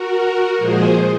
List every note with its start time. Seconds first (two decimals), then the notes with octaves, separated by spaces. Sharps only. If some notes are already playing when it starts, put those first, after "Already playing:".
Already playing: F#4 A#4
0.58 A#2 F3 G#3 G#4 C5